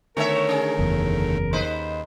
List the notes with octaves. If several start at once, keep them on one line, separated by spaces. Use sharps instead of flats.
D3 D#3 A3 B3 A#4 C#5 E5
C#4 G#4
F#1 E2
D#2 D#4 B4 C5